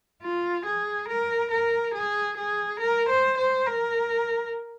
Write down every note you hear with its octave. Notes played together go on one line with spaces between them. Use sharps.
F4
G#4
A#4
A#4
G#4
G#4
A#4
C5
C5
A#4